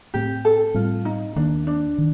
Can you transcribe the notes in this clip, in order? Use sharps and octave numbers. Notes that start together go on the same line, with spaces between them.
A2 A3 C4 G4
A4
A2 G3 C4 F4
D#4
D#2 D#3 A#3 D4
D4
D#3